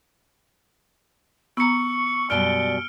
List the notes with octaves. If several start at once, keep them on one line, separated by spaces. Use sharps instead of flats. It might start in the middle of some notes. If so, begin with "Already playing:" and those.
B3 A#5 C#6 E6 C#7
F#2 B2 G3 D5 F6 D7 G7